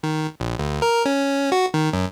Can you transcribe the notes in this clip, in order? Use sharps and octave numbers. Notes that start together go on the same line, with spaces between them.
D#3
A#1
D2
A#4
C#4
F#4
D#3
F#2